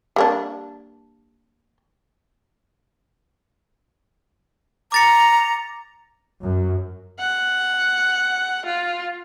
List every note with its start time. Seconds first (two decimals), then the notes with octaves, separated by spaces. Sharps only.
0.16 G3 A#3 D4
4.92 A#5 D6 A6 C#7
6.43 F#2
7.19 F#5
8.66 F4